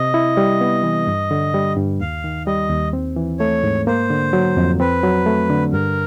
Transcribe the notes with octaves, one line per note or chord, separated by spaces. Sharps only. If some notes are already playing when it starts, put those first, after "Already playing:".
Already playing: C3 D#5
E4
G3
B3
E3
G2
D3
G3
G2
D#2 F5
D#3
G3 D#5
D#2
C4
E3
A3 C#5
G#2
A#3 C5
D3
F#3
F2
C4 B4
F#3
A3
D3
G2 A#4